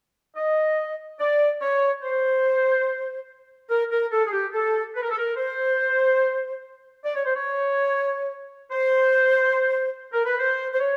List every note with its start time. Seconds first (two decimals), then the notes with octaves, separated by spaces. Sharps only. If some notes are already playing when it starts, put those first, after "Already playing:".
0.36 D#5
1.20 D5
1.61 C#5
2.03 C5
3.70 A#4
3.91 A#4
4.12 A4
4.26 G#4
4.32 G4
4.53 A4
4.96 B4
5.03 A#4
5.11 A4
5.18 A#4
5.37 C5
7.05 D5
7.15 C#5
7.25 C5
7.36 C#5
8.71 C5
10.13 A#4
10.26 B4
10.39 C5
10.73 C5
10.80 C#5